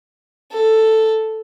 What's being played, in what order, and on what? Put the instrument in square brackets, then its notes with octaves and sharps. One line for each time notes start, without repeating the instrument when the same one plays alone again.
[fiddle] A4